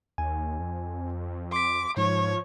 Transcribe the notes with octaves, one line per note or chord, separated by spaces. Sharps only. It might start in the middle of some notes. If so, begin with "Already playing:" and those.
D#2 G#5
F2
C6 D6 B6
G#2 F3 C#5